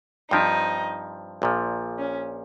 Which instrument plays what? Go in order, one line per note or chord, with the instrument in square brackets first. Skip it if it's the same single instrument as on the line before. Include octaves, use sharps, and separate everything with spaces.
[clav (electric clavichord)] G2 F3 C4 G4 [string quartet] D#4
[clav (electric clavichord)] A#1 A#2 F3
[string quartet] C#4